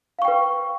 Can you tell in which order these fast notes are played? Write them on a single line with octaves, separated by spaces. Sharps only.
F5 C#6 G5 B4